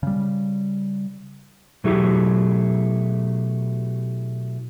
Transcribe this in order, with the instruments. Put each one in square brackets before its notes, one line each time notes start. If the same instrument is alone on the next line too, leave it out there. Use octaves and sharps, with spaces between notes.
[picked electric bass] C#3 G3
[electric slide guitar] B2 F#3 A3 E4 G4 G#4